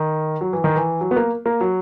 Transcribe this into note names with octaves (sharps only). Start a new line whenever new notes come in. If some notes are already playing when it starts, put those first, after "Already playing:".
Already playing: D#3
F#3
E3
D#3
E3
F#3
B3
A#3
A#3
F#3